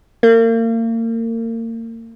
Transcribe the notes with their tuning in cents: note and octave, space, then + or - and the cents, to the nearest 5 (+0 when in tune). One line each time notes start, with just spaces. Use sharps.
A#3 -35